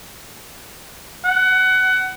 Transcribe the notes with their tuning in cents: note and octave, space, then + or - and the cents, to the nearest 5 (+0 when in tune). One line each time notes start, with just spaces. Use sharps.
F#5 +20